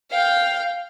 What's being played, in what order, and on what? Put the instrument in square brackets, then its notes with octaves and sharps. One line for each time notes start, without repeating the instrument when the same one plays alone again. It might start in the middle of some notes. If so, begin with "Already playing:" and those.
[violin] F5 G5